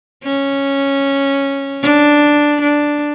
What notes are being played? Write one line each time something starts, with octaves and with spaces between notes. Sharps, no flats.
C#4
D4
D4